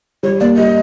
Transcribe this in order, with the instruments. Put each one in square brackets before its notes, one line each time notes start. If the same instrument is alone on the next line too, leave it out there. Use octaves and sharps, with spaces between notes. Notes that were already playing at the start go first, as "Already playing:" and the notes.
[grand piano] G3 [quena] C#5
[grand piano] A#3 [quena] D5
[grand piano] G3 [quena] D#5